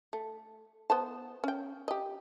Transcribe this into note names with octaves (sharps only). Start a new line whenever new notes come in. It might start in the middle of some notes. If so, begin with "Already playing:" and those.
A3
B3 C5 A5
C#4 G5
G4 D#5